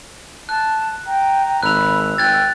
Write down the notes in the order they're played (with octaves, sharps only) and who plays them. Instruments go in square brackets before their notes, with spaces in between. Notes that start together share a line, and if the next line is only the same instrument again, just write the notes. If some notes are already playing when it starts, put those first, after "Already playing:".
[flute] A5 [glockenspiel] F#6
[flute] G5 [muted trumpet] A#5
[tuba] G#1 [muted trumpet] B5 [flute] E6 [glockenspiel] F#6 F7
[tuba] G#1 [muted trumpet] G5 [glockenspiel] F#6 G#6 A6